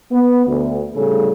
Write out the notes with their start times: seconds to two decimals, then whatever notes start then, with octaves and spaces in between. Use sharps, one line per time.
0.11 B3
0.47 D2
0.93 D2 A2 C#3 G3 A4